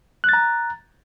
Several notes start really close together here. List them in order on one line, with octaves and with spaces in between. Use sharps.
F#6 A6 A#5